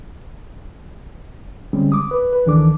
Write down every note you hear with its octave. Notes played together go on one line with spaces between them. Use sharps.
D3 G3 G#3 C4 C#4
D6 D#6
B4
B4
C#2 D#3 E3 D4 A4 D6